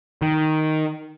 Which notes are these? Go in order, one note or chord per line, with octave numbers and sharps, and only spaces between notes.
D#3